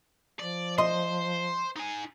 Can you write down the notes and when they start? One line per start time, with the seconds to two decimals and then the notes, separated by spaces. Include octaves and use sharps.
0.40 F3 D5
0.78 C5 D#5 C6
1.76 D#4 G#5